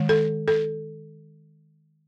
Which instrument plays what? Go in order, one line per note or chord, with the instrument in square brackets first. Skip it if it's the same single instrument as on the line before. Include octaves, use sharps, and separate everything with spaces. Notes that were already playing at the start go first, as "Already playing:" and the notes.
Already playing: [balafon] D#3 G#3
A4
A4